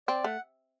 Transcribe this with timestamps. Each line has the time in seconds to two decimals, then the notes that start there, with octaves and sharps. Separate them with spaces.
0.08 C4 D5
0.24 A3 F#5